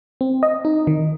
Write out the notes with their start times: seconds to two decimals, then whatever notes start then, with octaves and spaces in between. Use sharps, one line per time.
0.21 C4
0.43 D#5
0.65 D#4
0.87 D#3